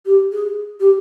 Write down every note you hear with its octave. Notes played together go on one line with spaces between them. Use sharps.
G4
G#4
G4